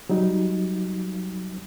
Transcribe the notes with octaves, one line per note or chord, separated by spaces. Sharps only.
F#3 G3 D#4